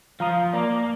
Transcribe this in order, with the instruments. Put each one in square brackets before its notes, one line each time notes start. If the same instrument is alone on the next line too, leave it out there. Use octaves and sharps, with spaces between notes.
[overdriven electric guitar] F3 [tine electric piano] F5 A#5 D#6
[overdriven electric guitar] A#3 [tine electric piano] D5 A#5 D6